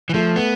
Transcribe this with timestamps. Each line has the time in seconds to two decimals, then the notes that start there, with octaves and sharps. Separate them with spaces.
0.09 E3
0.14 F3 A3
0.36 B3